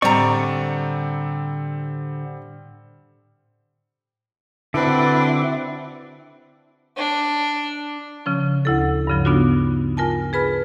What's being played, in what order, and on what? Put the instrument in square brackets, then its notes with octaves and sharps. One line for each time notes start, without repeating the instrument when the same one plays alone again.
[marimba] A2 [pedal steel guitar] D3 C#6 [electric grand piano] G3 C4 [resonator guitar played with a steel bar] D5 A#5
[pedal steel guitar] D3 D4 [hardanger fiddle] C4 F#4 [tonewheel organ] E4 E5 D6 [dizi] B4
[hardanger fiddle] D4
[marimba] C#3 F3 C#4
D2 E4 A4
G2 C#3 F3
B3 D4 D#4 F4 F#4
F4 A#4 G#5 A5
G#4 B4 B5 F6